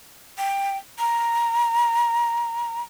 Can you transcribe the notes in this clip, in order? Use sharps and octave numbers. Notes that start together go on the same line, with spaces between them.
G5
A#5